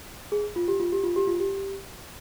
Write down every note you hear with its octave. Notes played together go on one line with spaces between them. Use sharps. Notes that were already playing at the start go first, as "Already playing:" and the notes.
G#4
F4
G4
F4
G4
F4
G4
F4
G4